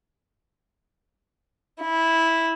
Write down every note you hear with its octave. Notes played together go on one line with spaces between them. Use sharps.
E4